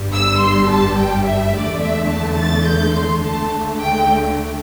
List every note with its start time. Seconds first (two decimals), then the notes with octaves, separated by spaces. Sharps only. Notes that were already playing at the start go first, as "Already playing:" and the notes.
Already playing: G1 G2 G3
0.14 E6
0.42 C6
0.70 A5
0.98 G5
1.27 E5
1.54 E2 D3 A3 D5
1.83 E5
2.10 A5
2.39 A6
2.67 G6
2.95 C6
3.24 D2 D3 A3 A5
3.80 G5